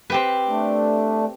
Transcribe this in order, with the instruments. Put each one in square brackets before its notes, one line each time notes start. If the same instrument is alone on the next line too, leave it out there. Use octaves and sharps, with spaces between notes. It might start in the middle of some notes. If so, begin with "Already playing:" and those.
[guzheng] C4 G4 B4
[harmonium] A3 D4